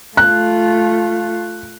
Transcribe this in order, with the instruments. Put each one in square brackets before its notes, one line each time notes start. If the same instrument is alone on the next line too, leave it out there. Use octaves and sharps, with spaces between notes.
[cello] A3 F4 [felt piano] F#6